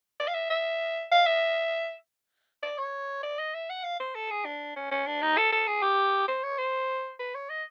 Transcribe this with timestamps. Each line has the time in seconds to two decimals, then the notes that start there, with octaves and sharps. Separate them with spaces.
0.20 D5
0.28 F5
0.34 E5
0.50 E5
1.11 F5
1.26 E5
2.63 D5
2.78 C#5
3.23 D5
3.39 D#5
3.54 E5
3.70 F#5
3.84 F5
4.00 C5
4.15 A4
4.31 G#4
4.45 D4
4.76 C#4
4.91 C#4
5.07 D4
5.22 D#4
5.37 A4
5.52 A4
5.67 G#4
5.82 G4
6.28 C5
6.43 C#5
6.58 C5
7.19 B4
7.35 C#5
7.50 D#5